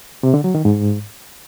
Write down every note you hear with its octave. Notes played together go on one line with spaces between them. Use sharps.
C3
D3
F#3
D#3
G#2